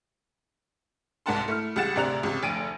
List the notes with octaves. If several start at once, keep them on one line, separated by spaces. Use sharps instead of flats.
C2 G#2 A#4 F#5 A5 C6
A3 E4 F6
C#2 G3 F#5 A6 E7
D2 C3 D5 A#5 F#6 F7
C#2 C3
F1 D2 D7 D#7